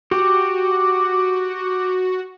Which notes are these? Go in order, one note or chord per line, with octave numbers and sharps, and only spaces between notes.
F#4 G4